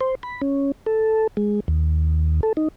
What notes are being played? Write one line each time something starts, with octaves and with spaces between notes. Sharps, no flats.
C5
B5
C#4
A4
G#3
D#2
A4
D#4